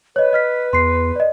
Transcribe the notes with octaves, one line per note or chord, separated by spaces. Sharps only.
B4 C#5 D#5
D#5 F6 B6
E2 C6 C7
D5 D#5